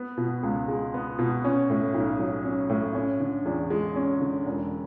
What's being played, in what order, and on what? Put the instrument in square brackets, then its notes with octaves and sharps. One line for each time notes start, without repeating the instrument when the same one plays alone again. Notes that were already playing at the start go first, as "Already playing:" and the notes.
Already playing: [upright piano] B3
B2
C#2
G#3
B3
B2
C#4
A2
B1
F#3
C#4
A2
C#4
D3
E2
G#3
C#4
D3
E1